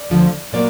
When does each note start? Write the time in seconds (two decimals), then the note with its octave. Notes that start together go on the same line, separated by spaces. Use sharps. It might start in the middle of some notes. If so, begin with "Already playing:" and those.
Already playing: D5
0.10 D2 D3 F3
0.53 A#2 F#3 A#3 D5